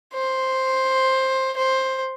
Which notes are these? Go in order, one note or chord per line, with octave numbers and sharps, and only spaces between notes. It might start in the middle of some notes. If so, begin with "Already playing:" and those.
C5
C5